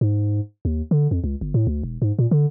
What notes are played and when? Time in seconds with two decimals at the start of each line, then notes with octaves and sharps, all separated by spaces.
0.01 G#2
0.65 D#2
0.91 D3
1.11 F2
1.24 C#2
1.41 G1
1.54 A2
1.67 D2
1.83 E1
2.02 G#2
2.19 A#2
2.31 D3